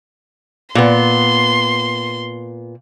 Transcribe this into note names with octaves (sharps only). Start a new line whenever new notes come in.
A#2 B3 C6